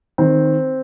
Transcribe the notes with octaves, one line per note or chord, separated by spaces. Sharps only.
D#3 C4